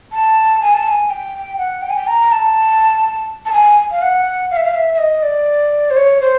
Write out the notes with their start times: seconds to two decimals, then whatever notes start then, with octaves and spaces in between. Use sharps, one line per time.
0.12 A5
0.61 G#5
0.74 A5
0.88 G#5
1.10 G5
1.58 F#5
1.82 G5
1.90 G#5
1.96 G5
2.07 A#5
2.32 A5
3.46 A5
3.53 G#5
3.91 F5
4.02 F#5
4.51 F5
4.57 E5
4.65 F5
4.75 E5
4.94 E5
4.98 D#5
5.23 D5
5.91 C5
5.97 C#5
6.21 C5